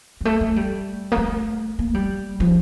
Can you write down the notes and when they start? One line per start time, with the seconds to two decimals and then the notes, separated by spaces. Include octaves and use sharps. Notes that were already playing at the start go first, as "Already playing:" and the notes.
0.21 G3
0.25 A3
0.41 A3
0.56 G3
1.12 A#3
1.17 A3
1.79 A#3
1.94 G3
2.40 F3